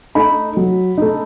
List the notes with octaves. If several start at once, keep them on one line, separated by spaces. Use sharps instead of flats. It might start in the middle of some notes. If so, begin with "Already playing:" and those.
A3 D#4 B5
F#3
A3 D#4